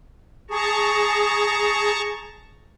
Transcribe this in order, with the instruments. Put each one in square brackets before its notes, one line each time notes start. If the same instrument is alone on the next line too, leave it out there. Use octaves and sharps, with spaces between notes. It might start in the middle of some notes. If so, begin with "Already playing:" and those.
[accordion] G#4 [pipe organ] A5 A#5 C#6